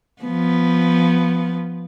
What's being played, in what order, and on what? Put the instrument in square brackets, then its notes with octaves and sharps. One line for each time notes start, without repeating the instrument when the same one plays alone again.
[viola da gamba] F3 B3